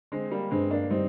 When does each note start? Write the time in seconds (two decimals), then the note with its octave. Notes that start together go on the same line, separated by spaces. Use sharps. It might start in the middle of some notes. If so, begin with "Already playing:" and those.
0.12 D3 G#3 C4
0.31 G3 A#3
0.51 G2 G#3 C4
0.70 A#3 D4
0.90 G3 C4 D#4